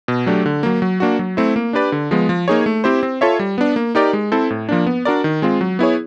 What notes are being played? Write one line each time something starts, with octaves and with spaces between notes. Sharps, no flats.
B2
F#3 A3 D4 G4
D3
F#3 A#3
F#3
A#3 D4 F#4
F#3
A3 C4 E4
A#3
D4 G4 B4 D5
D3
F3 G#3 B3
F3
A#3 D#4 G#4 C#5
A3
C4 E4 G4 C5
C4
F4 A4 C#5 E5
G3
B3 D4
A#3
D#4 G4 A#4 D5
G#3
C4 E4 A4 C5
A2
F3 A#3 D4
B3
D4 F#4 A#4 D5
D#3
G#3 C4 F4
F#3
B3 E4 G#4 C#5